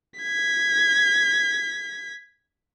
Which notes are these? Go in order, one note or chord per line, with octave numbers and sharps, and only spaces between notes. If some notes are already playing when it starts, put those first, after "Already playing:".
G#6 B6